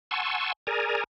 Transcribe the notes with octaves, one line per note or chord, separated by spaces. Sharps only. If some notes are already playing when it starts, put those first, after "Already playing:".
F#5 G#5 A5 C6 C#6 E6
G#4 A#4 D5 G#5 A#5